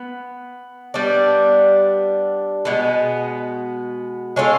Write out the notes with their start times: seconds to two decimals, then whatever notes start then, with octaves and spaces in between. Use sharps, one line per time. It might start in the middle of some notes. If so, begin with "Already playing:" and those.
Already playing: B3
0.94 G3 B3 D4
2.65 B2 G#3 B3
4.36 G#3 C#4 F4 A4